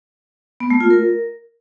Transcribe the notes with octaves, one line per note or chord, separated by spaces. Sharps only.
B3
A3
F4
A#4